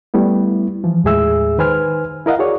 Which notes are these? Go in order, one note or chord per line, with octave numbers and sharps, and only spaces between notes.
G3 A3 B3 E4
E3 F3
D#2 A2 G#3 G#4 E5 E6
D#3 B4 C5 G#5 F6
E4 A#4 D#5 F5 F#5
F#4 G#4 C#5 D5